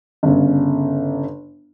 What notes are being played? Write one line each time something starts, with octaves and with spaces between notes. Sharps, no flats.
G1 C#3